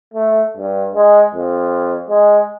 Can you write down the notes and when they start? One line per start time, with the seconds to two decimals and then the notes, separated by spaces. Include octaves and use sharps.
0.14 A3
0.57 G2
0.95 G#3
1.35 F2
2.10 G#3